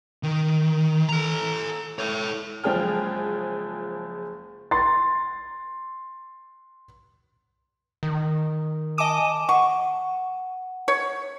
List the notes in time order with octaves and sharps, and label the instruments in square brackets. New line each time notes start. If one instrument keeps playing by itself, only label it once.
[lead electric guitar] D#3
A4 A#5
A4 C#5
[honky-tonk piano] F#1 F3 G#3 G#4 G5 F6
[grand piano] C6 A6
[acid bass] D#3
[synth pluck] D#5 D6 [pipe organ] G#5 A5
[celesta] F#5 [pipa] C#6
[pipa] C#5